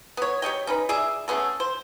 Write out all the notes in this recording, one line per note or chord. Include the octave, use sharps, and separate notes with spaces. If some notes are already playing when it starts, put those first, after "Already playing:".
B3 C#5
G4 C#5 D#5 G5
C#4 D#4 B4
G#4 D5 E5
A3 B3 C#4 G#4
C5